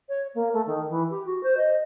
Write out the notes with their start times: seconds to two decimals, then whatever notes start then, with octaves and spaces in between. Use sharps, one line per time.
0.09 C#5
0.34 A#3
0.53 A3
0.66 D#3
0.89 E3
1.10 G4
1.25 F#4
1.43 C5
1.57 D#5